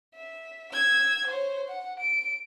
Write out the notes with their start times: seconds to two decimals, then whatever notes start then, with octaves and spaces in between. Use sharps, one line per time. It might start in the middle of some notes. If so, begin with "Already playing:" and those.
0.15 E5
0.72 E6 G#6
1.27 C5 C#5
1.68 F#5
2.00 D7